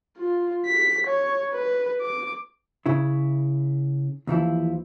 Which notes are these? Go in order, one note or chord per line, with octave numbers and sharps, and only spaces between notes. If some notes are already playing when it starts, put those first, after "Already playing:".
F4
B6
C#5
B4
D6
C#3 E4
D#2 E3 F3 E4